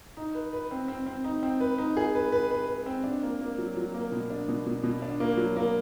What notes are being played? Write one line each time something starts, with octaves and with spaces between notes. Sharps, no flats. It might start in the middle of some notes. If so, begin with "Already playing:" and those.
D#4
B4
B4
C4
C4
C4
D#4
C4
B4
D#4
G#4
B4
B4
B4
B4
C4
D4
A#3
A#3
F#3
F#3
A#3
B2
D4
B2
B2
B2
D4
A#3
F#3
A#3